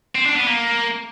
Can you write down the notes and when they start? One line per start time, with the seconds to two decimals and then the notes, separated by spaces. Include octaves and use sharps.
0.15 C4
0.25 D4
0.36 B3
0.46 A#3